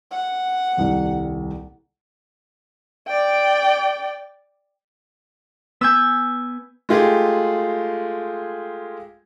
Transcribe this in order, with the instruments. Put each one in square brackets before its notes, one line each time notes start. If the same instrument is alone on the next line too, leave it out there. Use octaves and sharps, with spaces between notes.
[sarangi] F#5
[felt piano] D#1 C2 G3
[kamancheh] D5 G5
[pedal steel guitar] B3 G#5 [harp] E6 G6
[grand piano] G#3 A3 F4 G4 G#4